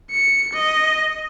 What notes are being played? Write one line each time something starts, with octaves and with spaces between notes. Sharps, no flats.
C#7
D#5